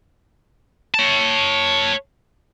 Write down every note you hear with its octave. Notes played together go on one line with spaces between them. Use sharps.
C#5 A5